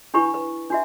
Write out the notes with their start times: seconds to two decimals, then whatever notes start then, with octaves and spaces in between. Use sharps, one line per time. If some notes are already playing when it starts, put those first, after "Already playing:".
0.14 D4 E4 G4 B4 B5 C#6
0.34 B4
0.70 D4 F#4 E5